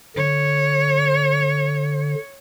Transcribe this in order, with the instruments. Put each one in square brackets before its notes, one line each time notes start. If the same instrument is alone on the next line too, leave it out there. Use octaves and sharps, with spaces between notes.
[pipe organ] D3 [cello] C#5